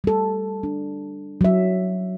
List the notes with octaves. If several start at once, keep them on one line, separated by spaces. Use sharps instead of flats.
G3 A4
D4
F#3 E5